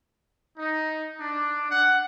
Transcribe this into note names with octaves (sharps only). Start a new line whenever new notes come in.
D#4
D4
F#5